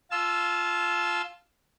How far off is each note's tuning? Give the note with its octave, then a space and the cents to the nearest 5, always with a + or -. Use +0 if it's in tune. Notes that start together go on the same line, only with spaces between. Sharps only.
F4 +0 A5 -25 E6 +10